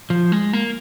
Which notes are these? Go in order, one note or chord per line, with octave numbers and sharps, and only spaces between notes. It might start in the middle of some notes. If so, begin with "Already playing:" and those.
F3
G#3
A#3